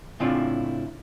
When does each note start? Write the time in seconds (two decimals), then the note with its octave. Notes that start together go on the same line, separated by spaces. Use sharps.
0.20 A2 C#3 C4 D4 E4 F4